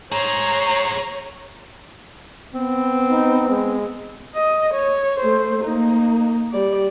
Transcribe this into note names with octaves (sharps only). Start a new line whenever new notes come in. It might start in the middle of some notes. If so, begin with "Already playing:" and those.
G#4 C5 C#5 A#5
B3 C4
D#4
G#3
D#5
C#5
A3 C5
A#3 D#4
G3 D5